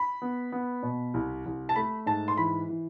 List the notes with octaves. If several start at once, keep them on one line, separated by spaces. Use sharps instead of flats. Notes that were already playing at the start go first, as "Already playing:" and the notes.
Already playing: B5
B3
B3
B2
C2
C2
A5
A3 B5
G#2 A5
C6
E3 B5
E3